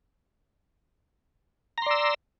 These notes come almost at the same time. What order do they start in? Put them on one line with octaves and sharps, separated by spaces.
A#5 C6 D5 E6